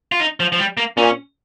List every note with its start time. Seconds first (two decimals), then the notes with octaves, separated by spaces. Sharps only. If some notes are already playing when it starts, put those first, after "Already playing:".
0.12 F4
0.20 D#4
0.40 F3
0.52 F3
0.59 G3
0.77 A#3
0.97 A#2 C#4